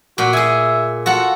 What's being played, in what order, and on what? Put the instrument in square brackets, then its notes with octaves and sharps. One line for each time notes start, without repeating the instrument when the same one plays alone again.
[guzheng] A#2 [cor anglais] F#4
[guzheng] G#4 G#5 [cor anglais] E5
[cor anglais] F4 [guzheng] F#4 A4 F#5